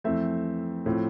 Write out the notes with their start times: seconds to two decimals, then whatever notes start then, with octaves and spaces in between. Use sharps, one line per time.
0.04 F2 E3 A3 C4 E5
0.86 A2 F3 C4